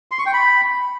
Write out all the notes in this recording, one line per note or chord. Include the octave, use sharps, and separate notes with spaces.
C6
C#6
G5
B5